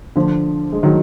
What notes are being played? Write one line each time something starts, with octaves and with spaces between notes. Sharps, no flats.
D3 F3
G#3
D#3 F#3